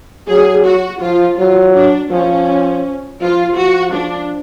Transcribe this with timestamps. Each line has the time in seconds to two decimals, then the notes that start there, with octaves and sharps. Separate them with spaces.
0.29 F#3 G#4
0.65 F#4
1.02 F3 F4
1.38 F#3 F4
1.75 D4
2.11 F3 C#4
3.21 F3 F4
3.58 F3 F#4
3.94 D4